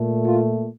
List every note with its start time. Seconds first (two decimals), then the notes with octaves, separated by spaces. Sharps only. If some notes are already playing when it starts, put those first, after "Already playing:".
Already playing: A#2 A3
0.25 F4